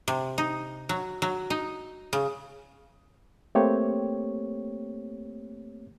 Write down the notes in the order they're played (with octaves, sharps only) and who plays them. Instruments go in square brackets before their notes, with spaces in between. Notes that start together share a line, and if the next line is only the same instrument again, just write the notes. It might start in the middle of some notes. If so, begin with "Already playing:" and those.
[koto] C3
D#4
F#3
F#3
D#4
C#3
[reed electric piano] A3 A#3 C4 G4 C#5